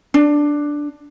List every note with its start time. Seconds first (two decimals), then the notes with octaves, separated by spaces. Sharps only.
0.14 D4